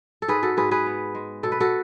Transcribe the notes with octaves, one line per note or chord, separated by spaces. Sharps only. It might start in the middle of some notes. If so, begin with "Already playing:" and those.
A4
G#2 G#4 B4
F#4 A4
G#2 G#4 B4
G#4 B4
B3
G#3
B2 A4
B4
F#4 A4